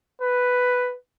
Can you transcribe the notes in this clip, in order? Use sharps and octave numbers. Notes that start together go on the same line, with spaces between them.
B4